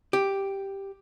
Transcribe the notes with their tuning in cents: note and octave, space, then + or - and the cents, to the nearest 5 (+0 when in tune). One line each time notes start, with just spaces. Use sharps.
G4 +0